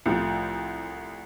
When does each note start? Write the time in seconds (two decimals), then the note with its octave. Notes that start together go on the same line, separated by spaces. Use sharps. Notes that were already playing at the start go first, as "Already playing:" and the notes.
0.06 C2 A2 F3